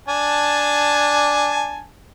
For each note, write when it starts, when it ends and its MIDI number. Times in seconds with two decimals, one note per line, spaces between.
0.08 1.85 62
0.08 1.85 80
0.08 1.85 81